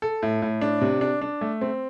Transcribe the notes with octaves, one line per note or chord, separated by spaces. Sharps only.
A4
A2
A2
D4
C3
D4
D4
A3
C4